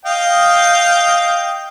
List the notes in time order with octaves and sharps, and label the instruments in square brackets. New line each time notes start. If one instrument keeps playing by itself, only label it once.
[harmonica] D#5 F5 G5